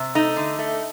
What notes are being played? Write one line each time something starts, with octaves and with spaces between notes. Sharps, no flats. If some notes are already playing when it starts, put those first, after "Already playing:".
Already playing: C3
A3 D#4
D3
A3